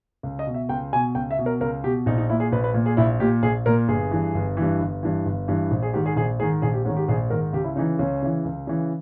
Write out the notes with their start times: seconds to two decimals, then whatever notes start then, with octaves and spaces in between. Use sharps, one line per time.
0.23 C#2
0.39 D#5
0.47 B2
0.54 E5
0.69 C#2 G5
0.93 B2 G#5
1.15 C#2 G5
1.31 E5
1.39 B2
1.46 A#4
1.61 C#2 A#4
1.84 B2 G4
2.06 A#1 D#4
2.18 D#4
2.29 A#2 E4
2.40 G#4
2.52 A#1 B4
2.64 B4
2.74 A#2
2.86 G#4
2.97 A#1 E4
3.20 A#2 G4
3.43 A#1 G#4
3.66 A#2 A#4
3.88 G1 G#4
4.11 G2 E3
4.34 G1
4.57 E3
4.62 G2
4.80 G1
5.03 G2 E3
5.25 G1
5.48 G2 E3
5.71 A#1
5.82 G#4
5.93 G#2 D#3 G4
6.06 G#4
6.16 A#1 G#4
6.39 G#2 G#4
6.43 D#3
6.62 A#1 G#4
6.74 G4
6.85 G#2 C#4
6.88 D#3
6.97 G4
7.08 A#1 G#4
7.30 G#2 D#3 A#4
7.53 C#2 G4
7.64 E4
7.76 C#3 E3 D#4
7.99 C#2 C#4
8.22 C#3 E3
8.45 C#2
8.67 C#3 E3